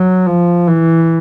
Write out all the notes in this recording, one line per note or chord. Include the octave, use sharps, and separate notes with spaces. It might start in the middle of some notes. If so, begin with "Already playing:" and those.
Already playing: F#3
F3
E3